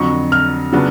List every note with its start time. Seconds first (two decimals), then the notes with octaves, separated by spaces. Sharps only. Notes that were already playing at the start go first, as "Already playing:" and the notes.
Already playing: F2 D3 F#3 C#6
0.32 F6
0.73 C#3 F#3 B3 D4